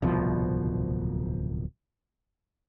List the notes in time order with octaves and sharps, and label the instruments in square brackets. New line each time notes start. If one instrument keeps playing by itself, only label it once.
[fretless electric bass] D1 C2 B2 F3